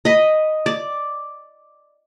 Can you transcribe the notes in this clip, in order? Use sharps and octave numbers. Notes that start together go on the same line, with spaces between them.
D#5 B5
D5